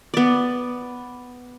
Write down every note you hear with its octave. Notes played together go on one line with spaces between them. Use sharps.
B3 D5